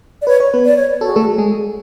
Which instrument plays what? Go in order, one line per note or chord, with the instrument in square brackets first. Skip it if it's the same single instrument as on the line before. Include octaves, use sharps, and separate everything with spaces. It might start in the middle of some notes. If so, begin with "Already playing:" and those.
[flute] D5
[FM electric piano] B4 [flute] C#5
[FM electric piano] C#5
B3 B4
[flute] D5
C#5
[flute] F#4 [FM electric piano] A4
[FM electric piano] G#4
A3 A4
G#3 G#4